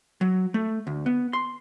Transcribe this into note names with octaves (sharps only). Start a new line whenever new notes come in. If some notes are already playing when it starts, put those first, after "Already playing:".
F#3
A3
D2
B3
C6